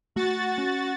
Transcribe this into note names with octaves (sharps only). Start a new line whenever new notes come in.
A3 F#4 A6
C#4